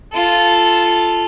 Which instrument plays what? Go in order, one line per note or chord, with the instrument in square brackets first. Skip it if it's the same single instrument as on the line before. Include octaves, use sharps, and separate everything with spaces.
[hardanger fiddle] F4 A4